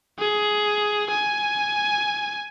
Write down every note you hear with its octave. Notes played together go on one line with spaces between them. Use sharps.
G#4
G#5